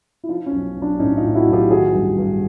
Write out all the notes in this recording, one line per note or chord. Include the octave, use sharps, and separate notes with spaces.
E4
F3 D#4 F4
C#4
B1
B1
D4
A2 C#4 D#4
D#4 F4
A2
E4 F#4
B1
F4 G4
D#3 F#4 G#4
G2
G2